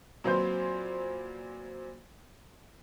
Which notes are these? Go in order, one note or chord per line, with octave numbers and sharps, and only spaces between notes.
A#2 F#3 C4 B4 C5 G6